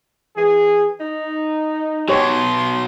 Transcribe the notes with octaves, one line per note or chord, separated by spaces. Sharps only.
E3 G#4
D#4
B2 F#3 G4 C#5 C6